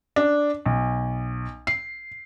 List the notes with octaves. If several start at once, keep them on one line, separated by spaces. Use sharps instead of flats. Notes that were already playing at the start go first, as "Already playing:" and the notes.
D4
B1
C7